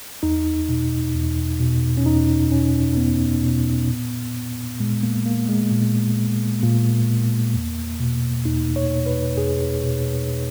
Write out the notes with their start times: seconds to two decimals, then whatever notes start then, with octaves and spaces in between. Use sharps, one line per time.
0.23 E2 D#4
0.69 B2
1.14 E2
1.60 B2
1.97 C#4
2.06 E2 D#4
2.51 B2 C#4
2.97 E2 B3
3.43 B2
3.88 A#2
4.80 A#2 G#3
5.03 A#3
5.26 A#3
5.49 G#3
5.71 A#2
6.63 A#2 A#3
7.54 E2
8.00 B2
8.45 E2 D#4
8.76 C#5
8.92 B2
9.06 B4
9.37 E2 G#4
9.83 B2